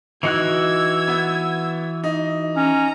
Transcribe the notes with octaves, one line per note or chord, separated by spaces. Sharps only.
E3 D#4 F#4 E6 F#6 G#6
B3
D#4
C#4 A#5